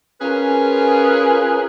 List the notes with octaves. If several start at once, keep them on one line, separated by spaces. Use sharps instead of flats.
C#4 F4 G#4 A#4 B4